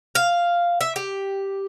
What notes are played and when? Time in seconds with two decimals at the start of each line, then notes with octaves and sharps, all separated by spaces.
0.15 F5
0.81 E5
0.96 G4